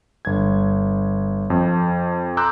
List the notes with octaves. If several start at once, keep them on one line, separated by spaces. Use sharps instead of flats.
G1 G#6
F2
A#5 C6 D6 E6 F#6 G6